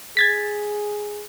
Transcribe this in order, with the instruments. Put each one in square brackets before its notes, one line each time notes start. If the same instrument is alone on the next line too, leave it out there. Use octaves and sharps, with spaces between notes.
[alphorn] G#4 [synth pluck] G#6 A6 B6